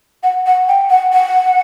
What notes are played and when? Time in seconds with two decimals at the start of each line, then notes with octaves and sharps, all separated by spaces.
0.23 F#5
0.46 F#5
0.68 G5
0.90 F#5
1.12 F#5